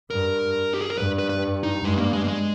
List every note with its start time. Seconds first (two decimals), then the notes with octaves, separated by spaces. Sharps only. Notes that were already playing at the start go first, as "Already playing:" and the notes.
0.10 G2 A#4
0.74 G4
0.81 G#4
0.90 A#4
0.97 G2 B4
1.19 B4
1.29 B4
1.63 D#4
1.85 G2 G#3
1.98 A#3
2.13 G#3
2.24 A#3
2.28 G#3